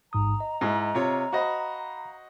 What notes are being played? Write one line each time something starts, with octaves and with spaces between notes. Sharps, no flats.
A1 G#2 A#5 D#6
D#5
G#2 E4
C3 F4 C#5
F#4 C5 D#5 F5 B5